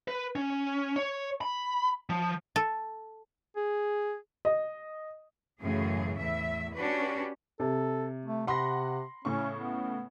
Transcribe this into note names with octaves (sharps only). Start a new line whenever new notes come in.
B4
C#4
C#5
B5
F3
A4
G#4
D#5
F#2 A2 C#3 E3 G#4
E2 A2 E5
C#4 D4 F#4 G4 B4
C3 A4
A3
C3 F#5 B5 C6 A#6
A2 C#3 C#4 C#6
B3